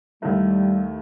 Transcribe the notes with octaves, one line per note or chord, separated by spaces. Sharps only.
D#2 D#3 G3 A3 E4